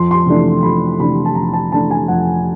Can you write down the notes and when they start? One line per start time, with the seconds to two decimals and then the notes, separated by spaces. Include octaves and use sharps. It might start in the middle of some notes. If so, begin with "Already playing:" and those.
Already playing: F2 C6
0.11 C6
0.26 C3 E3 A3 D4
0.63 F2 B5
0.99 C3 E3 A3 D4 B5
1.25 A5
1.35 F2 A#5
1.53 A5
1.72 C3 E3 A3 D4 A5
1.91 G#5
2.08 F2 F#5